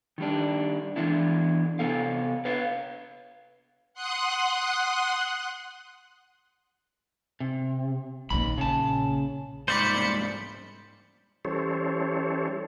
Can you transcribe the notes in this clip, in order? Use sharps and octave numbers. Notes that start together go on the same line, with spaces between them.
D#3 G3 D4
E3 B3 D4 E4
C3 B3 A4 F5
B4 C#5 F5
F#5 C6 D#6 F#6
C3
A#1 D#2 A#2 B5
C#3 A5
C2 G#2 C5 D5 B5 C#7
E3 G3 C#4 A4 C5 C#5